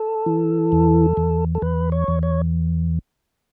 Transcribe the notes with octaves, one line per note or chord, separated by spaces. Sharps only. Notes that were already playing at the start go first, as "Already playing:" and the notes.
Already playing: A4
E3
E2
E2
A4
E2 B4
C#5
E2
C#5